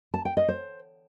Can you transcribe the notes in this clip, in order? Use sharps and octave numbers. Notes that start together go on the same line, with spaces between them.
A5
G5
D#5
C5